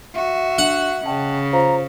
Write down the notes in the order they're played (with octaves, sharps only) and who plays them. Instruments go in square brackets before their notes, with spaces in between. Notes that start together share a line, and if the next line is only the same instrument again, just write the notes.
[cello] F#4 [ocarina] E5
[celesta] D4 [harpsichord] F#5
[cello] C#3 [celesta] D#5 G5 A5
[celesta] F4 C5 F5 [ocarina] A#5